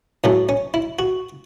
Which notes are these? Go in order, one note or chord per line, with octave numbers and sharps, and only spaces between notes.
A2 F#3 A3 C#4
C#4
E4
F#4